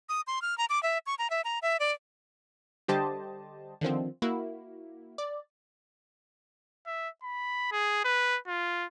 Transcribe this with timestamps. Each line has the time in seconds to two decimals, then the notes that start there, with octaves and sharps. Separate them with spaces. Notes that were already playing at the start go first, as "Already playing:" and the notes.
0.09 D#6
0.27 C6
0.42 F6
0.58 A#5
0.70 D6
0.83 E5
1.06 C#6
1.19 A#5
1.30 E5
1.45 A#5
1.62 E5
1.80 D5
2.88 D3 G3 G4 C5 D#5 A5
3.81 D3 D#3 F3 C4
4.22 A#3 E4 F#4
5.18 D5
6.86 E5
7.23 B5
7.72 G#4
8.04 B4
8.47 F4